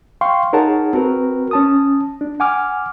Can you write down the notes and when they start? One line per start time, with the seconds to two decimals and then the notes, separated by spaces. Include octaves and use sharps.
0.21 F5 G5 C6 C#6
0.53 D#4 G#4 A#4 C#5 F#5 A5
0.93 C4 F#4 A#4 B4
1.51 C#4 A5 D#6
2.21 D4
2.40 F#5 G#5 D6 F6